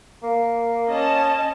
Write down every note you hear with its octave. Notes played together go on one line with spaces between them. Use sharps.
A#3
C#4 D#5 A5